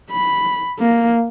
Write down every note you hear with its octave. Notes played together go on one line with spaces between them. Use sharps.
B5
A#3